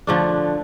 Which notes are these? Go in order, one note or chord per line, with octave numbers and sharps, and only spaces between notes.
D3 F3 A3 D4